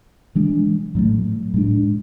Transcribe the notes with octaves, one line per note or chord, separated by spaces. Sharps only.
E3 G#3 D4
A2 F#3 A3
A2 G#3 D4